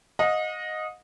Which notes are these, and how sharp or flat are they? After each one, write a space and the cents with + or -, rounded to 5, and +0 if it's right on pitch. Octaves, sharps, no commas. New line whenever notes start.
D#5 +0 F#5 -45